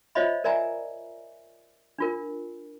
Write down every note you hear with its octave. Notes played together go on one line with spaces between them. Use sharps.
F4 C5 C#5 D#5 E5 B5
A#4 D5 E5 G#5 A#5
D4 F4 A#4